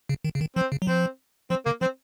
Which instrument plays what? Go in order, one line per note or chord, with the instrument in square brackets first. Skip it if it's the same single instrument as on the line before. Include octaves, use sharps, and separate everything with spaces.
[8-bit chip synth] C#3
D#3
C#3
D#3
[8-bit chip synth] F3 [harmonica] C4
[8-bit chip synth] C#3
F#3
[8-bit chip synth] F3 [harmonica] C4
[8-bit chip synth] F3 [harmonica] C4
[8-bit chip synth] C#3 [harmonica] A#3
[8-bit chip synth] F3 [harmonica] C4